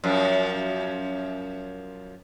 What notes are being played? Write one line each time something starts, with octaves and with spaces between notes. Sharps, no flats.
F#2 F3